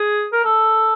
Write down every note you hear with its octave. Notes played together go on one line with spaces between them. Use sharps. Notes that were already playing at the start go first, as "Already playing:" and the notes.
Already playing: G#4
A#4
A4